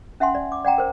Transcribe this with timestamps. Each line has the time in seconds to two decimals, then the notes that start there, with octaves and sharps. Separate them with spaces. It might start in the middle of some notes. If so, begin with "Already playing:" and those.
0.20 C#4 E5 F#5 G#5 C6
0.35 D5
0.52 D6
0.65 D5 F#5 G5 A#5
0.78 A#4 C5